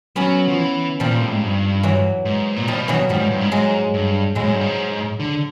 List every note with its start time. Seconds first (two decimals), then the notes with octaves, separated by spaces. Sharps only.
0.16 F#3 B3 C#4
0.48 F3
0.58 E3
1.00 A#2 F3 G3
1.11 A#2
1.21 A2
1.32 G#2
1.42 G2
1.83 E3 F#3
2.25 G#2
2.56 A#2
2.68 B2 F3 G3
2.88 E3 F#3
3.09 G#2 F3 G3
3.20 G#2
3.31 G2
3.41 G#2
3.51 G#2 F#3 G#3
3.94 G2
4.35 A2 F#3 G#3
4.43 G#2
4.53 G2
4.61 G#2
5.20 D3